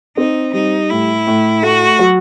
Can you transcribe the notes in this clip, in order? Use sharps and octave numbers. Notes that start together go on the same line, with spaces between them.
C4 D#4
G3 D#4
A2 E4
A2
A3 F#4
F#3